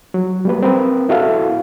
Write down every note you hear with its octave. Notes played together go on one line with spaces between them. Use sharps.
F#3
G3 A#3 B4
C4 A#4 B4
B3 E4 F#4 A4 E5 F5